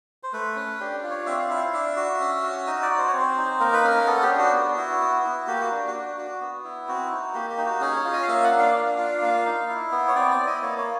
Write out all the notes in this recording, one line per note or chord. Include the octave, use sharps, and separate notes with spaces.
C5
A3 B4
C#4
D4 G4
F4
C#5
C4 E5
F5
E4 E5
F5
D4 E5
F#4
C#4
F#4
D#4 D#5
D5
F#4
C5
C#5
C4 C5
D#4
A#3 A#4
B4
C#4 A#4
B3 A4
G4
D4
F#4
B3
E4
B3
E4
A#3 G4
F#4
D4
F#4
D4
F#4
B3
E4
C4 F#4
D#4
A#3 G4
G4
D#4
F#4
C#4 G#4
C#5
F4
D#5
F5
A#3 E5
F#5
D4
F5
D4
F4
A#3
D#4
E4
B3
C#5
C4 D5
D5
E4
D#5
A#3 C#5
C#5